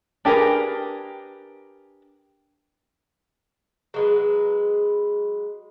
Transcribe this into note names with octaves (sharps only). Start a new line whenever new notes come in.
D4 G4 G#4 A#4 B4
F#3 G#3 B4